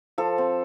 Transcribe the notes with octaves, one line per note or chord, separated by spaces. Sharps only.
F3 A4
C4